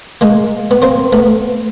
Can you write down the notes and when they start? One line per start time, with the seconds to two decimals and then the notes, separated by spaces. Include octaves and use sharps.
0.21 G#3 A#3
0.71 B3
0.82 A#3 C4
1.13 A3 B3